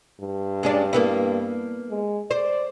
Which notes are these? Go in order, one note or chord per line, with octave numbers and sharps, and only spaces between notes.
G2
G#3 C#4 D4
A#3 B3 E4
G#3
C5 D5